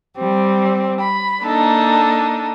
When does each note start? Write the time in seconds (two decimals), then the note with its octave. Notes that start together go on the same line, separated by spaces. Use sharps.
0.16 G3 C4
0.99 B5
1.41 A#3 D4 D#4 A4